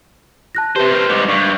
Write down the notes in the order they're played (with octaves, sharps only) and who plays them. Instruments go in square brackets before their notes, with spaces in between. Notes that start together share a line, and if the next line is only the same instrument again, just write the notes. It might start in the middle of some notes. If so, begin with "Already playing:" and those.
[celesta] A5 F#6 A#6
[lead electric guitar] C3 C5 [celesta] G4 B4
[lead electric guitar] A#4 C5
G#2 G3
[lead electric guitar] G2 [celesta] C#6